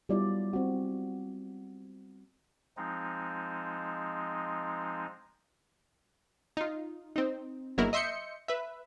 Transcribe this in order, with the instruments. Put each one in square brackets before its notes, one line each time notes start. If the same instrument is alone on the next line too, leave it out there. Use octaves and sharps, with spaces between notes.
[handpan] F#3 G3 B3 E4 F4 D5
C4 F#4
[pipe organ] F3 G#3 C4 D#4
[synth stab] D#4 F4
C4 D#4
G1 F#3 G#3 A#3 E4 A#4
D#5 E5 C6 G6 C#7
B4 E5